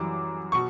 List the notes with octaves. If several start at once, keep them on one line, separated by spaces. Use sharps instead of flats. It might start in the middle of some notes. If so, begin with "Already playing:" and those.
Already playing: F#2 E3 G3 D6
B2 C#6